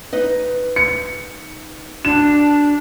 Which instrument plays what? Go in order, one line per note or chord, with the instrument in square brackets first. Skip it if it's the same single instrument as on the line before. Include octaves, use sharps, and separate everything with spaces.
[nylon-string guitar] D#4 B4 D#5
[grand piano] C#7
[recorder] D4 [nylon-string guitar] F#4 [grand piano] E7